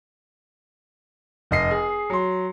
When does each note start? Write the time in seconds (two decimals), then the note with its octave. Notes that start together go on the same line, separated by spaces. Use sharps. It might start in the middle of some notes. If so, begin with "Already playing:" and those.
1.51 F1 D#5 C7
1.71 G#4
2.10 F#3 C6